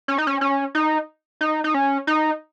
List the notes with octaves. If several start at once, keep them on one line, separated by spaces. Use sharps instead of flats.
C#4
D#4
C#4
C#4
D#4
D#4
D#4
C#4
D#4